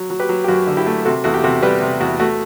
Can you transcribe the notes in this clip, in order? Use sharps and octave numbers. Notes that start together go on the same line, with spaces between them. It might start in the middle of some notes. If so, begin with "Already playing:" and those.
Already playing: F#3
F#3
G4 B4
F#3
G4
F#2 F#4
D3
E4 G4
A3
C3 F#4 A4
E2 F#4 A4
G4
C3 F#4 A4
G3 G4 B4
C3
E2 F#4
A3 F#4